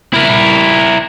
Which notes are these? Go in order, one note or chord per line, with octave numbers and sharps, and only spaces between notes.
E4 A#4